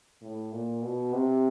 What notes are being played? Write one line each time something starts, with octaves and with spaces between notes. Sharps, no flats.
A2
A#2
B2
C3